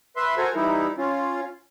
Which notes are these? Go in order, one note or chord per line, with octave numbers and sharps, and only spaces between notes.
B4 E5 C6
F#4 A4 A#4 C5 G#5
E3 G3 D#4 E4
C#4 F4